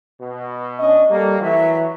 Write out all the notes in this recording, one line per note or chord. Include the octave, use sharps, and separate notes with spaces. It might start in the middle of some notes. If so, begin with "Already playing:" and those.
B2
C#4 D4 D#5 C#6
G3 A#3 A4
E3 F#3 E5